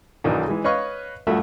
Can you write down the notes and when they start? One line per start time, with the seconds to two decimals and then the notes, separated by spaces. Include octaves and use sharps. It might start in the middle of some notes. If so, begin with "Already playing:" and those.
0.24 B1 D#3 E3 F#3 D4
0.48 E3 G#3
0.64 B4 C#5 D#5 F5 C#6
1.27 D2 G2 F3 A3 F#4 E5